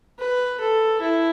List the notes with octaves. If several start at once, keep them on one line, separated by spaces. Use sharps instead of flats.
B4
A4
E4